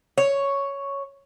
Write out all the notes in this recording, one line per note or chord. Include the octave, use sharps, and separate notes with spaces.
C#5